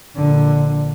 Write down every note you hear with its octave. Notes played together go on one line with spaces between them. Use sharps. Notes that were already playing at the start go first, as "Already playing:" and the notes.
A#1 D3